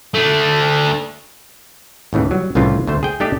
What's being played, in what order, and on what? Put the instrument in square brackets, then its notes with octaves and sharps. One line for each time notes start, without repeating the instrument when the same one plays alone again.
[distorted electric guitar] A3 D4
[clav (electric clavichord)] D#2 A2 C#3 E3
F#3 G3
C2 A2 C#3 E3 F4
D2 A3 C5
G#4 G5
A3 D4 G4 A4 D#5